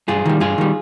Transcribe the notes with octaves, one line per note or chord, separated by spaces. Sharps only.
G2 F4 G#4
D#3 G3
G2 F4 G#4
D#3 G3